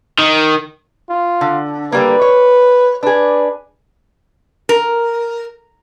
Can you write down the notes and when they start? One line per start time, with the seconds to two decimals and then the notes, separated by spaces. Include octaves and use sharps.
0.19 D#3
1.10 F4
1.41 D3
1.92 D3 G3 A#3 B4
2.22 C#5
3.03 D4 G#4 B4
4.69 A#4